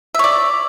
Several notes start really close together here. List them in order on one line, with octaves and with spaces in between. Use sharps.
E5 C#5 D5